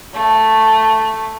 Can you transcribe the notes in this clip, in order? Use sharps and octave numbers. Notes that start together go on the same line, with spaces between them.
A3